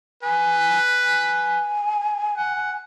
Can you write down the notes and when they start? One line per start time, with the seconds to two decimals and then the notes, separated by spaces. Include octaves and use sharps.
0.23 B4 G#5
1.03 G#5
2.37 F#5